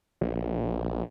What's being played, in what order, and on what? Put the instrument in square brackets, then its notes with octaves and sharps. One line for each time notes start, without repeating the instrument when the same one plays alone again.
[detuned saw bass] A#1